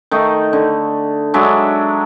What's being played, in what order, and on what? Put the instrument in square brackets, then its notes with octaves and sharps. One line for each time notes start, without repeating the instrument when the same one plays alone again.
[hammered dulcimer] D#3 A3 D#4
D3
F#3 G#3 D4 E5